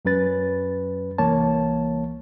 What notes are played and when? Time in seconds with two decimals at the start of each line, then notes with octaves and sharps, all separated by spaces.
0.05 F#2 F#3 C#4 B4 A6
1.18 C2 E3 A#3 C#5 A5